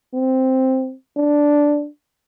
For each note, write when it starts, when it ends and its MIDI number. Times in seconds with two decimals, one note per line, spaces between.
0.15 0.94 60
1.17 1.88 62